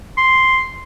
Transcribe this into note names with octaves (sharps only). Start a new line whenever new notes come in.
C6